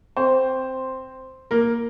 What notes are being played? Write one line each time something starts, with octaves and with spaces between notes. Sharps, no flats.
C4 C5
A#3 A#4